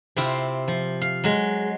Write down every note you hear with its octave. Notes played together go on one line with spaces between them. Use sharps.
C3 C4 E4 F4
F3
F5
F#3 G#3